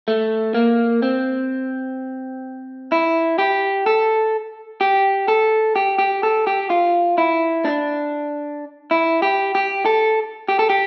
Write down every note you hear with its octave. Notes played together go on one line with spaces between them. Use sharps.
A3
A#3
C4
E4
G4
A4
G4
A4
G4
G4
A4
G4
F4
E4
D4
E4
G4
G4
A4
G4
A4
G4